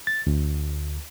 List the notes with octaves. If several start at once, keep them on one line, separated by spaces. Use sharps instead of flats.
A6
D2